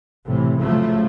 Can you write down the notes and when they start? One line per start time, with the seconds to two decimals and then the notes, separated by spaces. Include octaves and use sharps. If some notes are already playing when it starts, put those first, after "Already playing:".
0.26 A2 C3 E3
0.60 C#3 F3 F#3 A3